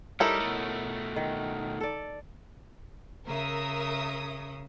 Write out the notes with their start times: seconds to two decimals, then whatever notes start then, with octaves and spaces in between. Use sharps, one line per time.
0.20 G3 D#4 E4 A4 A#4 C#5
0.40 B2 A3
1.16 D#3
1.81 A4 D5
3.27 C#3 A#4 E5 D#6